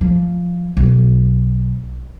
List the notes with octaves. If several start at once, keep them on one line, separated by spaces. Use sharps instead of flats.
F3
B1